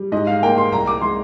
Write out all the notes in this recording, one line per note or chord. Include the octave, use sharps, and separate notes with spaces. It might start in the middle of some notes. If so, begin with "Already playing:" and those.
Already playing: G3
G#2 D#5
F5
A#3 G5
C6
C2 A#5
D6
G#3 C6